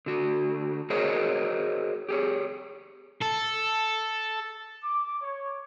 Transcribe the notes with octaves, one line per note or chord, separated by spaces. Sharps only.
D3 F#4
F#4 G#4 A#4 C5 C#5 D#5
G4 G#4 C#5
A4
D6
C#5